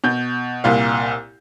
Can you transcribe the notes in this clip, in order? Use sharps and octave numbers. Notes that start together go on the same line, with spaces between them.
B2 G6
C2 A#2 F5